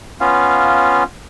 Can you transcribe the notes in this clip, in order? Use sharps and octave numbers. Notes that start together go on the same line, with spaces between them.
B3 C#4 F4 F5